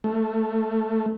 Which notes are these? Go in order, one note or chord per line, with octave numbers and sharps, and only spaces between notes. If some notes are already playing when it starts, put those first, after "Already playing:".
A3